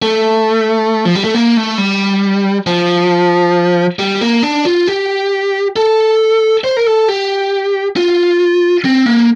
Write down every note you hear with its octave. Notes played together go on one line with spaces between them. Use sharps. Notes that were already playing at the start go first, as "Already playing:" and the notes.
A3
F3
G3
A3
A#3
A3
G3
F3
G3
A#3
D4
F4
G4
A4
C5
A#4
A4
G4
F4
C4
A#3